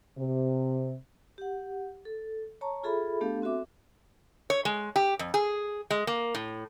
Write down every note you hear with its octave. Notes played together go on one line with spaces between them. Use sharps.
C3
G4 F#5
A4
C#5 A5 A#5 C#6
F4 G#4 A4 E5 B5
A3 B3 D4 G4 A4 F5
C4 F#4 A4 E5 D6
C#5
G#3
G4
F2
G#4
G#3
A#3
A2